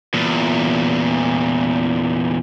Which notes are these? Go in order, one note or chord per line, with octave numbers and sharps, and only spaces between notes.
E2 A#2